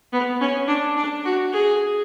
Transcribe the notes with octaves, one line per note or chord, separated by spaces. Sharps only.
B3
C#4
D4
D4
F#4
G#4